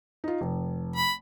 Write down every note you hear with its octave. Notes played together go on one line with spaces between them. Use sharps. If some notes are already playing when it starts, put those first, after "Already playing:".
D#4 F4
F1
B5